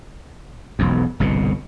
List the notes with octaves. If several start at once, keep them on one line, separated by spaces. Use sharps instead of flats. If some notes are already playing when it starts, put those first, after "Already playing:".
E1 B1 F2
G1 C2 B2